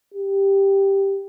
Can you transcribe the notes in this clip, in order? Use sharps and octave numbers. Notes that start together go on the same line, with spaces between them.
G4